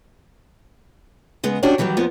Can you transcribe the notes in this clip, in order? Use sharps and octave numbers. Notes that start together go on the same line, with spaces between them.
C#3 G#3 B3
C#4 D4 F#4 G4
D#3 E3 F#3 G3 G4
F2 F3 B3 D4